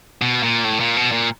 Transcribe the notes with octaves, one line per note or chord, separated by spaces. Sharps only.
B2
A#2
A2
A#2
B2
A#2